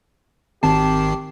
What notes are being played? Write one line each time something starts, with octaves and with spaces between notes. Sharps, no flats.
G#1 D#3 C4 G4 A5 C7 E7